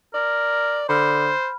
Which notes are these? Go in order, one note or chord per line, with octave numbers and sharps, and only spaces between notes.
A#4 D5
D3 C5 B5 F6